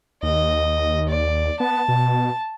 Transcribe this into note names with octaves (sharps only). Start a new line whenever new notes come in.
D#2 D#5
D5
B3 A5
B2